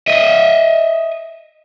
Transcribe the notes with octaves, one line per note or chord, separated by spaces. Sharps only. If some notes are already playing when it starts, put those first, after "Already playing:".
D#5 E5